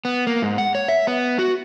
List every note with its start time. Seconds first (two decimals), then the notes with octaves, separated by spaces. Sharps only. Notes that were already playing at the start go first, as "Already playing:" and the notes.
0.05 B3
0.27 A#3
0.42 G#2
0.58 F#5
0.75 C#5
0.88 E5
1.07 B3
1.39 F#4